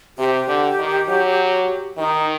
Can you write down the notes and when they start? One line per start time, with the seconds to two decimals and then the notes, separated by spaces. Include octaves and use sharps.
0.18 C3 G4
0.48 D3
0.79 D#3
1.08 F#3
1.98 D#3 D#4